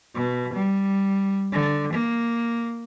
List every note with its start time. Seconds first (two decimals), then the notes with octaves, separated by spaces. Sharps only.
0.15 B2
0.54 G3
1.52 D3
1.93 A#3